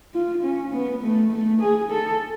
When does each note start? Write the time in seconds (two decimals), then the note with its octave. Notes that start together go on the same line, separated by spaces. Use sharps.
0.14 F4
0.43 C#4
0.73 B3
1.03 A3
1.31 A3
1.61 G#4
1.91 A4